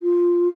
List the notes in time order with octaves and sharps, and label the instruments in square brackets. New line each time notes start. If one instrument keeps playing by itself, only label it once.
[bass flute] F4